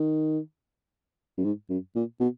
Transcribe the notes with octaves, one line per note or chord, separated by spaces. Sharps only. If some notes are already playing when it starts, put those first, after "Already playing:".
Already playing: D#3
F#2
G#2
F#2
A#2
B2